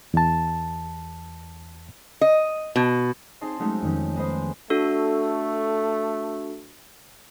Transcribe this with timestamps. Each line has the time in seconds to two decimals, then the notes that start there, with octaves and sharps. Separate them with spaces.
0.14 E2 A5
2.21 D#5
2.76 B2
3.41 C4 D#4 G#4 D#5 A5 C6
3.59 F#3 G#3 A3 C#4 D#4
3.82 F2 D#3 C#4
4.15 G#3 B3 B4 C5 D#5
4.70 A3 D4 F#4 A4